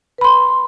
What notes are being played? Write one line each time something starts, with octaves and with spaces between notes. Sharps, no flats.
B4 B5 C6